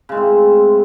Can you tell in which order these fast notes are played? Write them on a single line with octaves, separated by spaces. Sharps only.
C#3 G#3 A2 C4